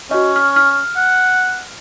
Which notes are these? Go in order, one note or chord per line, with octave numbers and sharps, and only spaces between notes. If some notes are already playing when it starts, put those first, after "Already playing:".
C#4 F#4 D#5
F6
F6
F#5